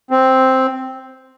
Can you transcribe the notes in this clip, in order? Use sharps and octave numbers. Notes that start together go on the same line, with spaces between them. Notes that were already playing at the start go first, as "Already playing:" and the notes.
C4